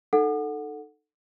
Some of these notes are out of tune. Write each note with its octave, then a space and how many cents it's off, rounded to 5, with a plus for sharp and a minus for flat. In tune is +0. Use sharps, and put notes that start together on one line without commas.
D#4 -20 A4 +5 F#5 -10